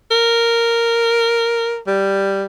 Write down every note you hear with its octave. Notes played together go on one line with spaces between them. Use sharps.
A#4
G3